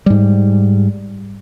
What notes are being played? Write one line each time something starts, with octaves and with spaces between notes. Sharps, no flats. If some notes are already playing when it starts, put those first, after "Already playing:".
G#2 G3